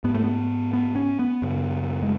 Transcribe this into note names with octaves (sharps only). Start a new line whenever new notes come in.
G#2 B3
A3
B3
B3
C#4
B3
F#2 C#3
G#3